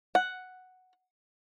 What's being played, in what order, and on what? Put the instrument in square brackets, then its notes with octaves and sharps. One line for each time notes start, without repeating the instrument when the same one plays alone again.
[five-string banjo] F#5